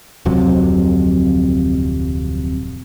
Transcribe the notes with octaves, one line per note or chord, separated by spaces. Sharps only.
D1 F2 C3 F#3